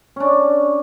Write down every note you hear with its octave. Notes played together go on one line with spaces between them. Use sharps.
C#4 D4